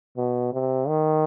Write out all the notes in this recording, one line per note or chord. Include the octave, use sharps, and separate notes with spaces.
B2
C3
D#3